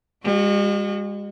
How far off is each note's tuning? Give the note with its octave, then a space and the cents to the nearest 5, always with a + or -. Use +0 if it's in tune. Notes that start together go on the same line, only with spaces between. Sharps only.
G#3 -40 F#4 +0